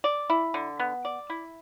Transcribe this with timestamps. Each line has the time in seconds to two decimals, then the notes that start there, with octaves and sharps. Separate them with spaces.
0.04 D5
0.30 E4
0.54 D3
0.79 B3
1.05 D5
1.30 E4